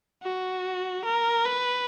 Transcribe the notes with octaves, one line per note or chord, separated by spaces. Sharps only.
F#4
A#4
B4